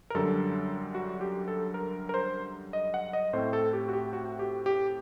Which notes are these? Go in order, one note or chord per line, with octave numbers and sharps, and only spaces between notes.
A#4
F#2 D3 G3 A4
F#4
G4
A4
A#4
A#4
C5
D#5
F#5
D#5
A2 A3 C4 C5
A4
G4
F#4
G4
F#4
G4
G4